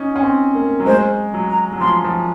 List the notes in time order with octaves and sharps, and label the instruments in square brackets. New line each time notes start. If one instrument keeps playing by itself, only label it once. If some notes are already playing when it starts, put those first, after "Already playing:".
Already playing: [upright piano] C#4 D#4
C#4
C4
A#3
F#3
[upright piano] G#3 [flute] C5
[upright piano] F#3
[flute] A#5
[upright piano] F#3
[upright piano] F3 [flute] C6
[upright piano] F3